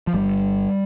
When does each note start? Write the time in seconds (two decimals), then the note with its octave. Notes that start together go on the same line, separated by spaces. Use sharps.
0.07 F3
0.14 G1 G3